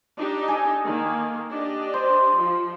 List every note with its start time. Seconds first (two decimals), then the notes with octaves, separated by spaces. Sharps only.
0.18 D4 D#4 G4
0.48 G#4 A4
0.85 D#3 A#3
1.52 D4 G4 D#5
1.94 C5
2.38 F3